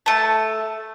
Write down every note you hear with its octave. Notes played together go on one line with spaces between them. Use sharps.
A3 A5